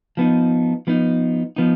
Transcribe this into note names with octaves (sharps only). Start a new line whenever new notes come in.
F3 B3 D#4
F3 B3 D#4
F3 B3 D#4